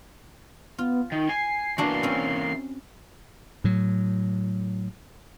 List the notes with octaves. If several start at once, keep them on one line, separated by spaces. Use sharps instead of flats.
B3 F4
D#3 D#4
G#5 C7
E3 A#3 B3 D4 F#4
C4 C#4
A2 F#3